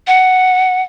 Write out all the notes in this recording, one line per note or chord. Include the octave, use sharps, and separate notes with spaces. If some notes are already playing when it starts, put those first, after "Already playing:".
F#5